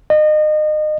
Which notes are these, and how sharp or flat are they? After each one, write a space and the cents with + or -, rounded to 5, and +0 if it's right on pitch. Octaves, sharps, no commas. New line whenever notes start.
D#5 -30